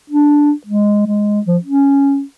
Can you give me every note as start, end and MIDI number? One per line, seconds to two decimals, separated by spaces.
0.10 0.52 62
0.67 1.04 56
1.07 1.40 56
1.46 1.58 53
1.64 2.22 61